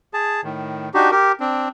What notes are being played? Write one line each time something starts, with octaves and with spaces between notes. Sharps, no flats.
G#4 A5
A2 D#3
D4 D#4 F#4 G4
G4 A#4
C4 D4